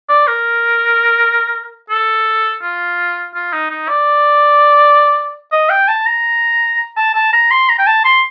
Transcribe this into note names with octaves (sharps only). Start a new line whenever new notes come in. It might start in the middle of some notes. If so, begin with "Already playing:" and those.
D5
A#4
A4
F4
F4
D#4
D#4
D5
D#5
G5
A5
A#5
A5
A5
A#5
C6
A#5
G5
A5
C6